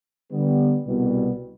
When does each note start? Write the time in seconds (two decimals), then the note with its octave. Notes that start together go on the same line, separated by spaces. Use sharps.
0.30 D3 G3 B3
0.86 C2 B2 G3 B3